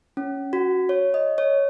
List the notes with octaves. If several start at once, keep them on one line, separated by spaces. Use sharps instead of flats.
C#4
F#4
C#5
D#5
C#5